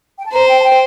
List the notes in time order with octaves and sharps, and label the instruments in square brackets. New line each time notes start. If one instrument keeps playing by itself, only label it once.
[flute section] G5
A5
[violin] C5 [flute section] A#5
[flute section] G5
A5
G5